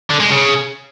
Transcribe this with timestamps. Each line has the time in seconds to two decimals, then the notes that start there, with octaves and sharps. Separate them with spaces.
0.10 D3
0.20 G#3
0.30 C#3